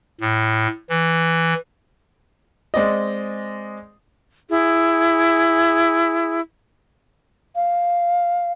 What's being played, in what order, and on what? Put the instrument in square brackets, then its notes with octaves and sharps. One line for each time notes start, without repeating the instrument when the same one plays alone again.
[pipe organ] A2
E3
[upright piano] G#3 C4 D5 D#5
[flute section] E4 G#4
[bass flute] F5